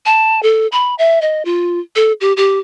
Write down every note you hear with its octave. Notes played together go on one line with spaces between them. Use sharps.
A5
A4
B5
E5
D#5
F4
A4
G4
G4